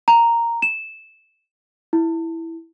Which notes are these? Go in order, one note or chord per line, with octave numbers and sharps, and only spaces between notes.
A#5
E7
E4